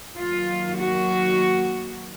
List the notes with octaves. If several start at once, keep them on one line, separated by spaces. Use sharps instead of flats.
D#3 F#3 A#3 F4
F#4